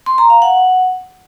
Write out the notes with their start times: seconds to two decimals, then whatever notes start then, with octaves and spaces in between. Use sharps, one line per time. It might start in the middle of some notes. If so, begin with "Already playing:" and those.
0.06 C6
0.18 A#5
0.30 F5
0.42 F#5